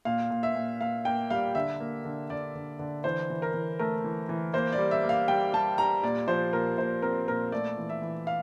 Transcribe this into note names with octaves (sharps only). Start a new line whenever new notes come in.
A#2 F5
A#2
E5
A#2
A#2 F5
A#3 G5
G3 F5
D3 E5
A#3
D3
D3 D5
D3
D3
E3 C5
E3
A#4
E3
A3 A#4
E3
E3
A#3 C5
D5
G3
E5
A#3
F5
G3 G5
G3 A5
G3 A#5
A#2 D5
F3 C5
A#2 A#4
A#2 C5
C4 A#4
A#2 A#4
A3 D5
E3
E5
E3
F5